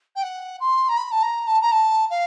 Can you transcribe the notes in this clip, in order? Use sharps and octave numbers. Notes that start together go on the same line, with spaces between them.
G5
F#5
C6
A#5
B5
A5
A#5
A5
A#5
A5
F5